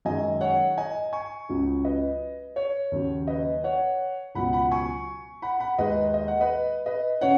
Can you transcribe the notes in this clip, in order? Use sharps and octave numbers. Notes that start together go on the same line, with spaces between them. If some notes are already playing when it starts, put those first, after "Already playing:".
F#2 D#3 G#3 D#5 G#5
C#5 F#5
D#5 G#5
G#5 C#6
C#2 C#3 F#3
B4 D#5
C#5
D#2 C#3 F#3
B4 D#5
C#5 F#5
C#2 B2 F#3 F#5 B5
F#5 B5
G#5 C#6
F#5 B5
F#5 B5
D#2 D#3 G#3 B4 D#5
D#5
F#5
B4 D#5
B4 D#5
C#3 C#5 F#5